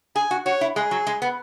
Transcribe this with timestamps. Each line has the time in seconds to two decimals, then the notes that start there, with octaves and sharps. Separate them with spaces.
0.16 G#4 G#5
0.31 F#4
0.46 F#4 C#5
0.61 E4
0.76 G#3 G#4
0.91 F#3
1.07 G#3
1.22 B3